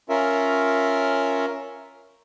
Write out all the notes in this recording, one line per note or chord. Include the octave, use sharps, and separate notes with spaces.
C#4 F4 A#4 E5